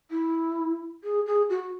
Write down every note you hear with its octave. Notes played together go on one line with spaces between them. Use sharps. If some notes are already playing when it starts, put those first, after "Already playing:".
E4
G#4
G#4
F#4